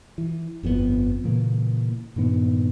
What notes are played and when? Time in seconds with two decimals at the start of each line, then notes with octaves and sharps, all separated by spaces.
0.18 E3
0.63 G1 F2 B2 B3
1.24 A#2 C#3 E3 A#3
2.16 G2 A#2 D#3 B3